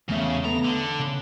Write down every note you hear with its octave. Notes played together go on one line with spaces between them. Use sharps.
E2 C#3 A3 E5
B3 A4 A#5
D3
C#3